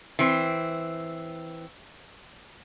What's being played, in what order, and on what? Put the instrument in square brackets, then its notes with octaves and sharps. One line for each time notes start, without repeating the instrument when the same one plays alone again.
[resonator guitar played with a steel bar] E3 C4